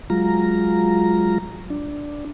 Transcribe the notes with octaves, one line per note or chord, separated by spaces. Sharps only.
F#3 G#3 F4 A#5
D4